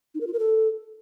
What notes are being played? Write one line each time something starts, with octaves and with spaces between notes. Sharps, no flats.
D#4
A#4
F4
A#4
A4